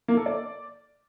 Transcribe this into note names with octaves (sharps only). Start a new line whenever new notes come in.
A#3
A4
D5